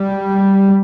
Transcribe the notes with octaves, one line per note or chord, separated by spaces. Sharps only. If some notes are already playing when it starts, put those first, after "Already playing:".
Already playing: G3